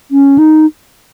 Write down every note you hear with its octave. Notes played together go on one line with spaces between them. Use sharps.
C#4
D#4